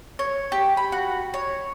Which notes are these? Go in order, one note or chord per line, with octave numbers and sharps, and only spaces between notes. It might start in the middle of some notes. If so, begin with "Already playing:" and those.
C#5
G4
B5
F#4
C#5